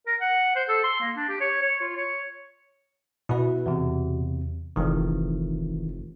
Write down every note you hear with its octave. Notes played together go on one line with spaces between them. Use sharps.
A#4
F#5
C5
A4
C6
A#3
D4
G4
C#5
C#5
F4
C#5
B2 E4 B4
E2 C3
F1 A#1 D#3 E3